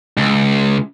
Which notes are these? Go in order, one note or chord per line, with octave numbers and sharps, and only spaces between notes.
C#2